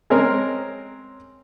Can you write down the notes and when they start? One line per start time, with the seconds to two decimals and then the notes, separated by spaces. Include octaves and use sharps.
0.10 G#3 C4 C#4 A#4